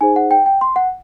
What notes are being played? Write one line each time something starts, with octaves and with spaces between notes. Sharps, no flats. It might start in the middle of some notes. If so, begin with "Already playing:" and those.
D#4 G#4 C5 G#5
F#5
G5
G5
C6
F#5